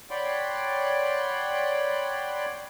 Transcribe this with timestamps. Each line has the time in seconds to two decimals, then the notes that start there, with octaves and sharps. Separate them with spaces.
0.11 C#5 D5 F#5 G5 B5 C6